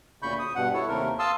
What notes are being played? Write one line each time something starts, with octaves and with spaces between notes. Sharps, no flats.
D2 A#2 C#3 B5 C#6 G6
D#6
G2 B2 F#5
E4 A4 C#5
D#2 C3 A3 A#4
F5 A5 C6 D#6 E6